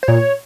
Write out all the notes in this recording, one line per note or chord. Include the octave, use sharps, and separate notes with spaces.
C5
A#2 C#5